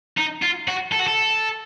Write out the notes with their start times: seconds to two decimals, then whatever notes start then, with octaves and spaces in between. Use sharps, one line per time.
0.17 D#4
0.42 F4
0.68 F#4
0.92 A4
0.99 F#4
1.07 A4